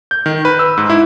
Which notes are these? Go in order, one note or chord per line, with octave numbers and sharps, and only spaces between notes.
G6
D#3
B4
E6
G#2
E4